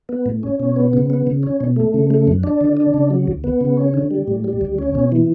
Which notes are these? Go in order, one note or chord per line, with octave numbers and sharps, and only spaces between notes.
B3
A2
C#4
B2
B3
C#3
B3
C#3
C#4
B2
A3
C#3
A3
F#2
D4
D3
D4
C#3
F#3
D2
B3
C#3
C#4
D3
G3
A2
G3
D2
C#4
B2
E3